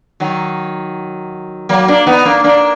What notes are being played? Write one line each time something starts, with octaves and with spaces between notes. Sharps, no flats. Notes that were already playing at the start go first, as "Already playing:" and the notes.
D#3 F#3
F#3 A#3
A#3 D4
B3 D#4
A#3 D4
A#3 D4